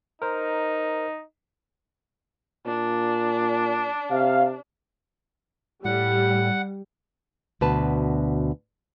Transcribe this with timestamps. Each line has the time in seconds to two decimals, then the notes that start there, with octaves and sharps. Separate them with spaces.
0.22 D#4 A#4 C5
2.66 A#2 D4
4.11 C3 F5
5.85 A2 G3 F#5
7.61 D2 B2 B4 A5